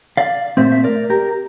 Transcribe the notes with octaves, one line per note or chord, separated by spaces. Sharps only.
D5 F5
A#2 A3 C4 C5 E5
E5
A#4 D5
G4 A#4